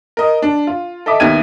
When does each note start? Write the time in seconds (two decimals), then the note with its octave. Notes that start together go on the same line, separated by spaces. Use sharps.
0.17 A#4 D#5
0.42 D4
0.67 F4
1.06 A4 D#5 E5 D6
1.20 D#2 B3 E4 G4 G#6 D#7